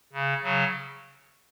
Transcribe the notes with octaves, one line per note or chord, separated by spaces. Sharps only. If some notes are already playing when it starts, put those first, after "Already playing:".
C#3
C#3 F#3